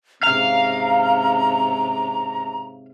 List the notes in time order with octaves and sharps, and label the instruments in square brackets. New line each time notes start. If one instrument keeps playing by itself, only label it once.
[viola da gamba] G#2 C3 C#4 [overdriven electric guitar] F5 [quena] A#5